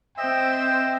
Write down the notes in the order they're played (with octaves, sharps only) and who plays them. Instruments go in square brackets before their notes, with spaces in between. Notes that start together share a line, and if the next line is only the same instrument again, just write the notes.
[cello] C4 C5 [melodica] D#5 E5 E6 [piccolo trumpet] G5